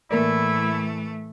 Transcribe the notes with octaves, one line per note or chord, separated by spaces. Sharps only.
A2 E3 A3 A#3 E4 A#4 D5